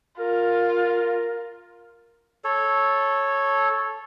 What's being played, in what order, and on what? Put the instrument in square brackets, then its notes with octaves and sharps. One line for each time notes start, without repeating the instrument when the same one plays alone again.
[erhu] F4 [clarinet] A#4
[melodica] A4 C#5